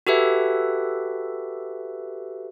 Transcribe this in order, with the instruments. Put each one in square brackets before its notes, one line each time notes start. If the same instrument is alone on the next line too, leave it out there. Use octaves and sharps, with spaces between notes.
[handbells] F#4 G4 A4 B4 E5